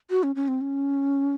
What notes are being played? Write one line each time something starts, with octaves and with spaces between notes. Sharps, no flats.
F#4
C#4
C#4
C4
C#4